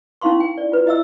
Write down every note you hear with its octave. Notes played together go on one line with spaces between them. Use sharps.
C#4 D#4 E4 F5 C6 C#6
G5
D5
F4 B4
E4 D#5 E5 E6